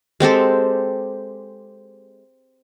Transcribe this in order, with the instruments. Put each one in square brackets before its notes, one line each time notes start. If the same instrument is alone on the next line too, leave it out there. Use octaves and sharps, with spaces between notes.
[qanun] G#3 C4 G4 A4